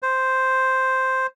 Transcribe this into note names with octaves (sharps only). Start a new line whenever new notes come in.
C5